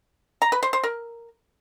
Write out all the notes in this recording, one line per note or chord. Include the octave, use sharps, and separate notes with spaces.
A#5
B4
C5
C5
A#4